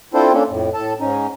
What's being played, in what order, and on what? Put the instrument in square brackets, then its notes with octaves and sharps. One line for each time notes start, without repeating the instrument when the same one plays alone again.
[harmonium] C4 D4 E4 F4 A4 C5
A#3 C#4 D4 A4
F2 A2
A2 A4 A5
G#2 C#4 D#4